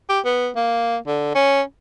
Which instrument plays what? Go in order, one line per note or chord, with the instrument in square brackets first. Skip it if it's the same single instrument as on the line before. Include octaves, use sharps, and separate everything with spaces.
[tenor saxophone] G4
B3
A#3
D3
C#4